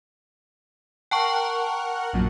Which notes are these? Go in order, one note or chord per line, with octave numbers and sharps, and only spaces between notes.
A#4 F#5 G5 A5 C#6
A#1 F#2 A#2